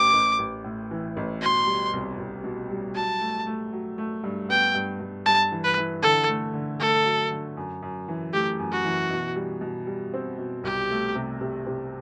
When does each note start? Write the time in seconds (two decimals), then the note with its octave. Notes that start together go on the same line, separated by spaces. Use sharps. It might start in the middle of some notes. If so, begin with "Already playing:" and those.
Already playing: A1 D6
0.13 A1
0.39 A1
0.64 A2
0.91 E3
1.17 A1
1.41 B2 C6
1.67 G3
1.93 C2
2.18 C2
2.44 B2
2.70 G3
2.95 F#3 A5
3.21 A3
3.47 A3
3.73 F#3
3.98 A3
4.24 G2
4.49 B3 G5
4.75 G2
5.00 G2
5.26 G2 A5
5.52 E3
5.64 B4
5.78 E3
6.02 D3 A4
6.28 A3
6.54 D3
6.79 A3 A4
7.05 F#3
7.31 D3
7.57 F#2
7.82 F#2
8.08 E3
8.33 A3 G4
8.59 F#2
8.72 F#4
8.85 E3
9.10 B2
9.36 G3
9.61 B2
9.87 G3
10.14 C4
10.38 B2
10.64 C2 G4
10.90 A3
11.15 C3
11.41 C3
11.67 C3